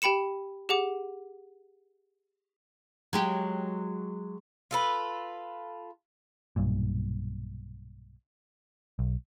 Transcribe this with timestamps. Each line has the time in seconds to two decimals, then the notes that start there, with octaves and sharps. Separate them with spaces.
0.02 G4 G5 B5 C#7 E7
0.69 G4 G#4 F#5 D6
3.13 F#3 G#3 G4
4.71 F4 A4 B4
6.56 B1 G2 A#2
8.99 B1